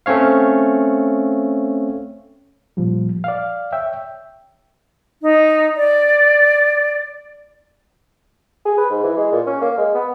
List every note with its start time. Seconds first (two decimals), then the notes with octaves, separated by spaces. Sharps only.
0.06 A3 C4 C#4 C#5 F5
2.77 A#2 F3 G3
3.24 D5 F5
3.72 C#5 E5 G5
5.22 D#4
5.76 D5
8.66 G#4
8.78 B4
8.90 G#2
9.04 E3
9.17 G#3
9.32 A#2
9.47 C#4
9.62 A#3
9.78 G#3
9.95 B3